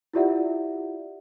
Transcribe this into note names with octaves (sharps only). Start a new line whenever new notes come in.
E4 F4 G4 D5 E5 F#5